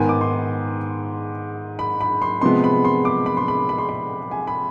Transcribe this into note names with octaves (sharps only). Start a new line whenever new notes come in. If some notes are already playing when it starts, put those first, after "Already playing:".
Already playing: G#2 D#3 B3 G#5
D6
C6
B5
B5
C6
C3 F3 G#3 B3 C6
B5
C6
D6
B5
C6
B5
B5
C6
B5
G#5
B5